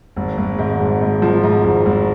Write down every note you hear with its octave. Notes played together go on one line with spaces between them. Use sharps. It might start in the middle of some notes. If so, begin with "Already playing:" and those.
G#1
G#1
G#2
G#1
G#2
F3
G#2
G#1
G#1